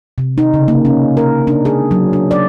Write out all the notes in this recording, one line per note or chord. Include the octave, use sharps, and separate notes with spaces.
C3
D#4
C#3
A#3
C#4
A#4
D4
G#4
F#3
D4
D5